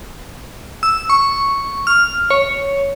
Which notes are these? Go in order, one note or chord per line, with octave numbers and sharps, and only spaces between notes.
E6
C#6
F6
C#5